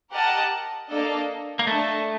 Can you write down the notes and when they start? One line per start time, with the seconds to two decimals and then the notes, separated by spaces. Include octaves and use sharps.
0.11 G4 A#4 D#5 F#5 A5
0.89 A#3 D4 A4 D#5
1.59 A#3
1.66 A3 D4 A4 D#5 A5